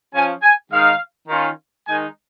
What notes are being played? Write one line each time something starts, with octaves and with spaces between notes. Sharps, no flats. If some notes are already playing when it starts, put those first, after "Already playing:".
F3 C#4 F4 G#5
G#5
D#3 G#3 D#4 F5
D#3 C#4 F4
D#3 G#3 D#4 G#5